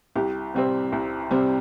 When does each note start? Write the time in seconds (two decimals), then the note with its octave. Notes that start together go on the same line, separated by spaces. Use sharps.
0.15 C2 G4
0.54 C3 G3 C4
0.92 C2
1.31 C3 G3 C4